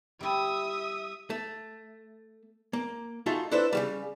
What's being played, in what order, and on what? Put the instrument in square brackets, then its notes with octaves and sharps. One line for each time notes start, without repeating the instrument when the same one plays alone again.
[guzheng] G3 E4 [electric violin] E5 D#6
[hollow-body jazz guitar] A3
A#3
A3 D#4 F4 F#4 G#4 A4
D4 E4 A4 B4 C5
C#3 F#3 G3